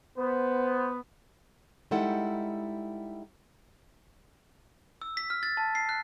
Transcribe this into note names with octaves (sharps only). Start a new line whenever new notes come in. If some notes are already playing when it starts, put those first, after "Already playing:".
B3 C5
G3 G#3 D#4 E4 A4 F#5
E6
B6
F6
A6
A5
C7
F#6